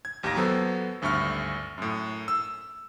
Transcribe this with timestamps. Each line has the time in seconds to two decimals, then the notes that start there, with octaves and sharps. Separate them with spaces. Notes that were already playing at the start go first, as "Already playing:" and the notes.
0.05 G#6
0.23 A1 D#2 G4 G5 A#5 A#6
0.36 F#3 B3 A4 C5
1.02 G#1 D2 G2 E5 C#6 F6
1.78 F#2 A2
2.28 E6